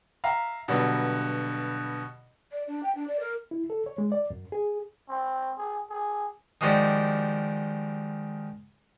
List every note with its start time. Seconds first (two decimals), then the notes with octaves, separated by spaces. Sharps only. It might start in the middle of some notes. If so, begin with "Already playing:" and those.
0.24 E5 F5 A#5
0.68 G2 B2 D3 F#3
2.52 D5
2.67 D4
2.83 G5
2.95 D4
3.08 D5
3.20 A#4
3.51 E4
3.70 A4
3.86 C#5
3.98 G#3
4.12 D5
4.30 F#2
4.52 G#4
5.09 C4
5.58 G#4
5.90 G#4
6.61 D#3 F3 G#3 F#4 G4 D5